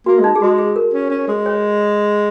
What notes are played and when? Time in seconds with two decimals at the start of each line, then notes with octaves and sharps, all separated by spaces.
0.06 A#3 F#4
0.19 G#3
0.24 D#4
0.35 G#4
0.42 G#3 F#4
0.58 G#4
0.76 A#4
0.93 C#4
1.10 C#4
1.28 G#3
1.46 C#5